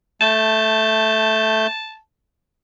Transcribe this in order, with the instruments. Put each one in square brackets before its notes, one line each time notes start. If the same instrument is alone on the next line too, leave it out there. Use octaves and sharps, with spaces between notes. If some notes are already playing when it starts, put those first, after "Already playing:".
[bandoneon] A3 G6 [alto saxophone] A5